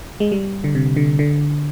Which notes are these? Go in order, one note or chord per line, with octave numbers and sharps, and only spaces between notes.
G#3
G3
D3
C3
D3
D3